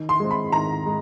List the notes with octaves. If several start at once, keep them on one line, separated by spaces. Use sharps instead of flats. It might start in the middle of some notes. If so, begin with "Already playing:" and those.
Already playing: D#3
C6
G#3 C4
B5
D#3 A#5
G#3